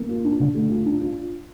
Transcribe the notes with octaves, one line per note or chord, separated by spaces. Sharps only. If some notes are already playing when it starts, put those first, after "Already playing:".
Already playing: A#3
F4
D4
D3
A3
F4
D4
F4